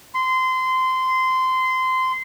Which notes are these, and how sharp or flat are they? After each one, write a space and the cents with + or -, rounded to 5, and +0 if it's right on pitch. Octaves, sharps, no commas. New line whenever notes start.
C6 -20